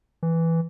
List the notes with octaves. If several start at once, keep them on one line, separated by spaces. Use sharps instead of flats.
E3